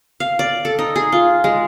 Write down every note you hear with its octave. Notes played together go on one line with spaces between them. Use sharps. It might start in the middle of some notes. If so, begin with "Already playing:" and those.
F5
D5
A4
D#4
G#4
F4
G#3